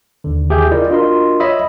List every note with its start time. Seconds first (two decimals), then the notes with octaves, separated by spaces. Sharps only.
0.24 D#2 D3
0.49 D#2 C#3 G4 G#4 E5 G6
0.72 E4 F4 A#4 D5 D#5
0.90 D4 F4 F#4 A#4 D#5 C6
1.40 C#5 D#5 E5 B5 D#6